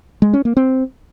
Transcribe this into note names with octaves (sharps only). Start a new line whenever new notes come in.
G#3
C#4
A#3
C4